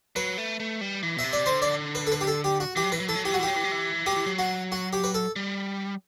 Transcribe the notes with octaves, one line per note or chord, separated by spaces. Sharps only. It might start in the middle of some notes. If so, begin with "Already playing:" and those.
F#3 B4
A3
A3
G3
E3
B2 E5
C3
D5
D3 C5
D5
B4
A4
B4
G4
A4
G4
F#4
E3 G4
F#3
E3 B4
F#3
E3 A4
F#3
E3 G4
F#3 F#4
E3
F#3 G4
E3
F#3
E3
F#3 G4
E3
F#3
F#4
F#4
G4
B4
A4
G3